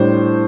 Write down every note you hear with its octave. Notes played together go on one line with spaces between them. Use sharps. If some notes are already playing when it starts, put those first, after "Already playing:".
Already playing: A2 G3 D4 C5